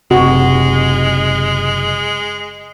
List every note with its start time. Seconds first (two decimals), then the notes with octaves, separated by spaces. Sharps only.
0.11 F#1 C3 G#3 F#4